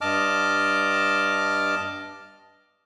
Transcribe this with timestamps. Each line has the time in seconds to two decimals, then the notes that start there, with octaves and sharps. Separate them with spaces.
0.01 G2 D#5 A5 D6 F6